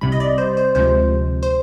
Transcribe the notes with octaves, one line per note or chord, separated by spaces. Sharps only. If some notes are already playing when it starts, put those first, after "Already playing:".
C2 C3 G3 B5
D#5
D5
C5
C5
D2 C3 F3 G#3 C5
C5